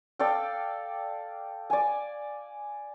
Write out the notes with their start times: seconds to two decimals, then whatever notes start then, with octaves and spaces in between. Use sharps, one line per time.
0.19 A4 D5 F5 G5
1.70 D5 G#5